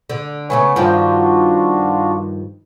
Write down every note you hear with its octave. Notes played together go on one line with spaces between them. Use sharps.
D3
C#3 A3 B3 C#5 G#5
G2 D#3 F3 D4 F4 F#4